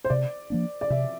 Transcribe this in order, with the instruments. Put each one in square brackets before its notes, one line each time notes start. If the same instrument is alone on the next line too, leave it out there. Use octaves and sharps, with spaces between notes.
[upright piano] C5
[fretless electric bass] C3 [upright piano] D5
[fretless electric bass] F3 A#3 D4
[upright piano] D5
[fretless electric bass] C3 [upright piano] E5